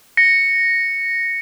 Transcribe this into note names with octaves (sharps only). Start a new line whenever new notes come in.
A#6 C#7